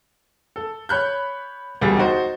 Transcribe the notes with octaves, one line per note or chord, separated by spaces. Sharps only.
A4
C#5 B5 F#6 G6
E1 D2 G3 G#4 A6
D#4 F#4 C5